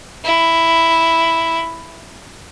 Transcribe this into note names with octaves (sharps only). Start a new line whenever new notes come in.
E4